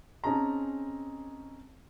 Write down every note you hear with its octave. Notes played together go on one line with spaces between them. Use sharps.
C4 C#4 D#4 G#4 A5 A#5